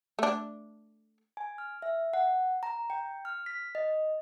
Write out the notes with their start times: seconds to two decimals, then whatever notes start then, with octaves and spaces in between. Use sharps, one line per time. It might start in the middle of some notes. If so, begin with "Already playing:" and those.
0.19 A3 D4
1.37 G#5
1.58 F6
1.82 E5
2.13 F#5
2.63 A#5
2.90 G5
3.25 F6
3.46 B6
3.75 D#5